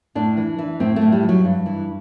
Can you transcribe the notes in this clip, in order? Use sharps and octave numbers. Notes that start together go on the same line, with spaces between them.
A2 D4
E3
E3
A2 C4
A3
A2
G3
E3
F#3
G2
E3